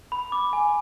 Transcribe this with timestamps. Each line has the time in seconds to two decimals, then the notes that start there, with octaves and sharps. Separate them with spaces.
0.12 B5
0.32 D6
0.53 G#5